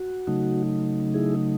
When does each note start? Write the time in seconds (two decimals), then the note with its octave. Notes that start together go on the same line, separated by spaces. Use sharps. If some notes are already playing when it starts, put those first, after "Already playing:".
Already playing: F#4
0.27 C#3 F#3 A3 D#4
1.14 E4 G#4